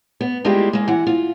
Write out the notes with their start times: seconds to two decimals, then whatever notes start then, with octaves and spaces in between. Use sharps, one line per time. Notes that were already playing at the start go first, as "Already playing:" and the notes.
0.21 B3
0.44 G3 G#3 A#3 E4 F4 G4
0.73 G#3 A#3
0.88 E3 F#5
1.07 F4